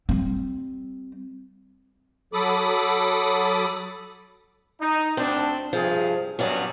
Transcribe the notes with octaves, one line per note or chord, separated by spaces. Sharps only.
G3 C4
F#3 A4 B5 D6 D#6
D#4
D2 C4 D4
G2 C3 F3 G#4
G2 B2 F#3 C#4 F#4 D5